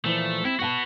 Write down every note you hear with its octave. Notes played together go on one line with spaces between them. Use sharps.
A#2 E3 F3 A3
C4 E4
B3 F#4 B4 F#5 A5